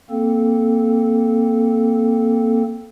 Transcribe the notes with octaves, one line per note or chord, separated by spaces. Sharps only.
A#3 C4 A4